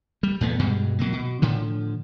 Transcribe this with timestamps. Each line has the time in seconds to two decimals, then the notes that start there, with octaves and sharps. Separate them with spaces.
0.23 G3
0.41 E2 A#2 A3 B3
0.59 G2 B2 G3 G#3
0.99 B2 F#3 A#3
1.13 B2
1.42 A2 D3 F3